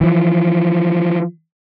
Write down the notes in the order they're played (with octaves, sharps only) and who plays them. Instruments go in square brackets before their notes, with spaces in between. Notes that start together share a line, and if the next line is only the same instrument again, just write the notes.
[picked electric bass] E3 F3